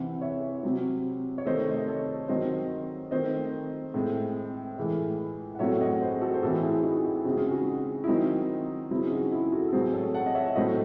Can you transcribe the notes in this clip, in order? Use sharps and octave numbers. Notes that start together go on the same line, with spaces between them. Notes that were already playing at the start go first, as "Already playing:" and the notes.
Already playing: C3 E3 C4 F#5
C#5 E5
C3 F#3 C4
C#5
C3 D#3 A3 C5 D#5
D#5
A4 C#5
D#3 F#3 C4 C5 D#5
D#3 A3 C4 C5 D#5
A2 G#3 C4
A2 E3 G#3
F#5
A2 F#3 A3 C4 C#5 E5
D#5 F#5
G#4 C5
F#4 A4
C5
A2 E3 C4 F#4 A4
E4 G#4
D#4 F#4
E4
C#3 G#3 C4 F#4
G#4
D#4 F#4
E4
D#3 F#3 C4 D#4
C#3 F#3 C4 E4
G#4
D#4 F#4
E4 G#4
F#4 A4
A4
A2 F#3 C4 G#4 C5
A4 C#5
F#5 A5
D#5
C#5 E5
A2 F#3 A3 C4 C5 D#5